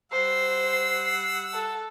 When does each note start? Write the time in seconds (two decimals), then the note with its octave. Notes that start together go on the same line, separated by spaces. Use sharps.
0.12 G3 C5 F#5 E6 C7
1.54 A4